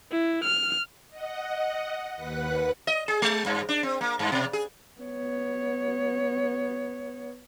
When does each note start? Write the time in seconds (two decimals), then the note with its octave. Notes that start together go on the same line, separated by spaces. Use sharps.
0.11 E4
0.44 F6
1.10 D#5 F#5
2.15 D#2 B4 F#5 F#6
2.87 D#5
3.08 G#4
3.22 G#3
3.46 G2
3.69 D4
3.83 C4
4.01 A#3
4.19 G2
4.32 B2
4.53 G#4
5.00 B3 C#5